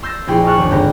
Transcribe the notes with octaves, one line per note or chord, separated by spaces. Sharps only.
C6 E6 G6 A6 A#6
A#1 E4 G#4 G5 C6
D#5 A5 C#6 F6 F#6
G1 D#2
G#2 D3 C4 B4 G5 A#5